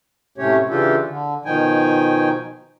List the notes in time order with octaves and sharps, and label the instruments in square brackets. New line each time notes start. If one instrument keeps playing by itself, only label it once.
[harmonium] A2 C3 A3 C#4 G4 C#5
C#3 E3 D4 F4 G4 A4
D3
B2 D#3 F3 D#4 G5 G#5